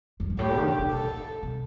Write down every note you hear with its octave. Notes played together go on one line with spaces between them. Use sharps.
F#2
G2
A2 G4
D#3
D3
C3
A#2 A4
C3